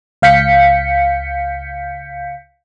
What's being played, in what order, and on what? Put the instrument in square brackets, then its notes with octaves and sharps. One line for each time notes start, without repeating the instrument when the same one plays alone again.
[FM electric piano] C#2 F5 G6 B6 C#7